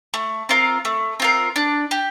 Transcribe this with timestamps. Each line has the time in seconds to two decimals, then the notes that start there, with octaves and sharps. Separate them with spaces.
0.14 A3
0.49 C4 F4 A#4
0.85 A3
1.20 C4 F4 A#4
1.56 D4
1.91 G4